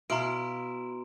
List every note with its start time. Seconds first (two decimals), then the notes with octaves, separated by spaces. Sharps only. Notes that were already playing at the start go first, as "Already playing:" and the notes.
0.10 B2 E4 F5 A#5 C6 D7